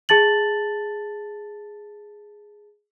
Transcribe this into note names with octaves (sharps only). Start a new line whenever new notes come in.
G#4 A5 A6 F#7